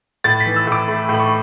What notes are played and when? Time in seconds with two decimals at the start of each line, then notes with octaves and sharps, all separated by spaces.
0.24 A2 A6
0.40 B6
0.46 E3
0.56 E6
0.67 A2
0.72 D6
0.88 A3 B5
1.09 A2
1.14 B5
1.20 C#6